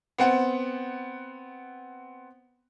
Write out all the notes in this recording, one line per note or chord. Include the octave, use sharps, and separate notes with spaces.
B3 C4 F#5